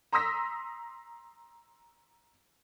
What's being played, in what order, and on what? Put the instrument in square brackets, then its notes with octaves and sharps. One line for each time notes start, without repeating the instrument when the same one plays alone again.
[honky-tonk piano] A#5 C6 D#6 E6 A#6 B6